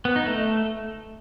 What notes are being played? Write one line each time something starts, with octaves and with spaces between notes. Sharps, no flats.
B3
D#4
A3